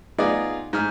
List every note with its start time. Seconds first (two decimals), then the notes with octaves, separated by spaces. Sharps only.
0.18 B3 D#4 F4 G#4 D5
0.73 G#2 F6